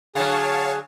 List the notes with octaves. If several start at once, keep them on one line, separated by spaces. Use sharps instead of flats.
D3 F#3 G#4 C#5 F5 A5